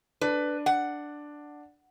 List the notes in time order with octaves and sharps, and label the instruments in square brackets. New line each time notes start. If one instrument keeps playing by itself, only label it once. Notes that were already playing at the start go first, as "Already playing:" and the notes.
[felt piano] D4 [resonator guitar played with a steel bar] B4
[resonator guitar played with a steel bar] F#5